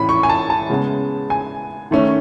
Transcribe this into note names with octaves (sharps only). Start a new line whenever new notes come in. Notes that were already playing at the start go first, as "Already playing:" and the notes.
Already playing: A2 E3 C#4 B5
C#6
G#5
A5
A5
C#3 G#3 B3
G#5
D#3 A3 C#4